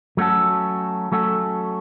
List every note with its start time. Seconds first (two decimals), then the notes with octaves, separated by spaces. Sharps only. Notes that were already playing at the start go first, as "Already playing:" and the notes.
0.17 F#3 A3 C#4 F#4 A4
1.12 F#3 A3 C#4 F#4 A4